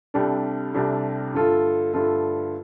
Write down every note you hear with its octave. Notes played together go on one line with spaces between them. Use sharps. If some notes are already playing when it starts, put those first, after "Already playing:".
C2 C3 G3 D4 A4
C2 C3 G3 D4 A4
G2 D3 A3 F4 A4
G2 D3 A3 F4 A4